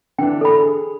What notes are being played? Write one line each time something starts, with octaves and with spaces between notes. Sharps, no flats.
D3 E3 D4 G5
A4 B5
G#4